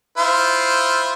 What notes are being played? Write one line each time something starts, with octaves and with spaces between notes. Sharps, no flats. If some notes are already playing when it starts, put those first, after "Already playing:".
E4 F4 C5